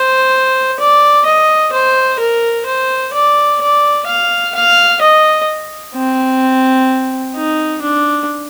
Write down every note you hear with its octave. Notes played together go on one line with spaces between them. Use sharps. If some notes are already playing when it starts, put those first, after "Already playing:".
Already playing: C5
D5
D#5
C5
A#4
C5
D5
D5
F5
F5
D#5
C4
D#4
D4